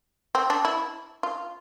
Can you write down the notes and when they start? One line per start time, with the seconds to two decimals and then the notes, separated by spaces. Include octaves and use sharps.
0.35 C4
0.50 D4
0.65 E4
1.23 F4